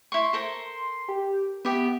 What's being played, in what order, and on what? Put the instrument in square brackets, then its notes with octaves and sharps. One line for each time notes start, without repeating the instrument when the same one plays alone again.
[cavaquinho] E4 C#6 [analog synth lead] C6
[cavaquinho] A4 A#4 C5
[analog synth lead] G4
[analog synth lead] B3 [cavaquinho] G4 E5